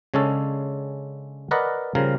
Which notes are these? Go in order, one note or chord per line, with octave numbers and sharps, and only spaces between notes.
C#3 G#3 C#4 D4 A4
A#4 B4 D5 D#5 F#5
C#3 F3 G3 A#4